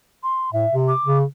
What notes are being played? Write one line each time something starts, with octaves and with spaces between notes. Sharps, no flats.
C6
A2 E5
C3
D6
C#3